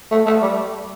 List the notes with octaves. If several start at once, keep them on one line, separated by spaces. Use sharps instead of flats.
A3
A3
G3